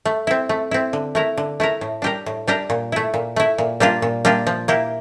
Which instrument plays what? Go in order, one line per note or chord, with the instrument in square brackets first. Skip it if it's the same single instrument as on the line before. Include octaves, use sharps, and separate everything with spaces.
[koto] A3
C4 E4
A3
C4 E4
D3
A3 E4 A#4
D3
A3 E4 A#4
A2
G3 D4 G4 A#4
A2
G3 D4 G4 A#4
A#2
A3 E4
A#2
A3 E4
A#2
G3 A#3 D4 F4
A#2
G3 A#3 D4 F4
F3
A#3 E4 G4